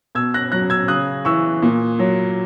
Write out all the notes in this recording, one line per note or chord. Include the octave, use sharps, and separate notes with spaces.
B2 E6 G#6
F#6 A#6
F#3 F#6 A#6
E6 G#6
C#3 D#6 F#6
E3 C#6 E6
A#2
F#3